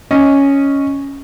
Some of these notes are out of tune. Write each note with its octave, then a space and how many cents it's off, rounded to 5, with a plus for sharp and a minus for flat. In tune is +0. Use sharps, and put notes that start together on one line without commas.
C#4 +0 D#5 +0